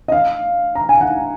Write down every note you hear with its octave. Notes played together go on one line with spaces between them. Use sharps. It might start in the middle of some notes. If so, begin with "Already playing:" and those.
D#5
F5
A#5
G#5
F#5